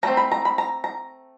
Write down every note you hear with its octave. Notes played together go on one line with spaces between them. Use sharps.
F#3 A3 C4 A#5
B5
A#5
B5
A#5
A#5